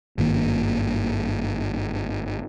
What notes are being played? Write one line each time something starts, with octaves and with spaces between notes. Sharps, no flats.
G#1 G2 D#3 A#3